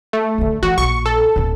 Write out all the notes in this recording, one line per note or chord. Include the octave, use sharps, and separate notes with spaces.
A3
D3 D#3
E3 F#4
A#1 C#6
A4
D1 E4